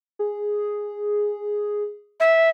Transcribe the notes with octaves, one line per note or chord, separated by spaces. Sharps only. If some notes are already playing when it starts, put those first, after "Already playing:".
G#4
E5